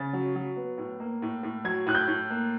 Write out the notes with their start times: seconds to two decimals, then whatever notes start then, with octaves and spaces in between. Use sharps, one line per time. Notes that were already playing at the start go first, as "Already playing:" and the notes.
Already playing: C#3 A6
0.13 F#3
0.36 F#3
0.56 B3
0.78 A2
1.00 A#3
1.22 A2
1.43 A2
1.64 F#3 G#6
1.87 A2 F#6
1.95 G6
2.08 A2
2.30 A#3